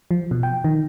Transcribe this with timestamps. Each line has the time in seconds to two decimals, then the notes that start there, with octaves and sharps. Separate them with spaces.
0.11 F3
0.31 B2
0.43 G5
0.64 D#3